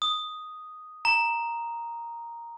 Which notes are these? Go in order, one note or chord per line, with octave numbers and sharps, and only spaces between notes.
D#6
A#5